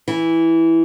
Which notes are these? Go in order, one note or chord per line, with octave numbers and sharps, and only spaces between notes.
E3